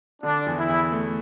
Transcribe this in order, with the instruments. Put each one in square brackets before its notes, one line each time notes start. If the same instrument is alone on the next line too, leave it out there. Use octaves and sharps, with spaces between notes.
[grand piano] D3 [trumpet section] D4
[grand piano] E2
[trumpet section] E4
[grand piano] E2
A3